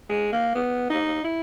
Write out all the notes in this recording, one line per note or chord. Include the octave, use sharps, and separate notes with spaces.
G#3
A#3
B3
D#4
E4